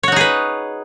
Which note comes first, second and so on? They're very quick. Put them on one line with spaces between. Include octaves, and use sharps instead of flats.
C#5 F#4 D#4 G#4 B4